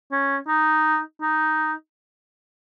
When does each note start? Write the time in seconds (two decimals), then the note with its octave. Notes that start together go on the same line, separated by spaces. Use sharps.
0.12 C#4
0.48 D#4
1.21 D#4